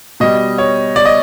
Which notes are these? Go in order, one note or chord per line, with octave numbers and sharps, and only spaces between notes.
B2 G3 D#5
C#5
D5
D#5